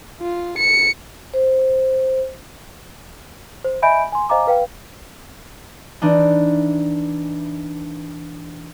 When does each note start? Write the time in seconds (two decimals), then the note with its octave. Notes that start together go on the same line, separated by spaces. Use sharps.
0.21 F4
0.58 C#7
1.34 C5
3.65 C5
3.82 D#5 E5 G#5 B5 G6 D7
4.12 G#5 C6
4.29 C5 D#5 F5 G#5 A#5 D6
4.47 B4 F5 G5
6.02 E3 D4 D#4